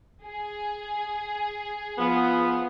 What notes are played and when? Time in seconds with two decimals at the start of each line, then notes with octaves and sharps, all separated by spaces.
0.25 G#4
1.98 F3 B3